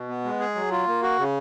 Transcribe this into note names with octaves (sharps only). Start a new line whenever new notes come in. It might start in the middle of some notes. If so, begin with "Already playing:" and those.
Already playing: B2
B3
G#3
G#4
F#3
F4
A#3
F#4
C#3